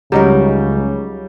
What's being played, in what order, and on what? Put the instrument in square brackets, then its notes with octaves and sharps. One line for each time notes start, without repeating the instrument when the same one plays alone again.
[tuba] C#2 [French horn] C#3 [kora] F#3 D#4 A#4 [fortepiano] G3